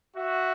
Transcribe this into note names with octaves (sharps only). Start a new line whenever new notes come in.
F#4 E5